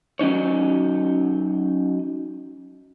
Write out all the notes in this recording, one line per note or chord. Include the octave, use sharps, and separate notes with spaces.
F#3 C#4 D#4 C#5